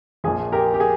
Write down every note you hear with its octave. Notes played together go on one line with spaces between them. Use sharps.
A#1 A#2 F3 G#4
G4 A#4
G4
G#4